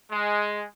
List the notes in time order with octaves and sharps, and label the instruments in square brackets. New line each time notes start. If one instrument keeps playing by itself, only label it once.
[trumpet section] G#3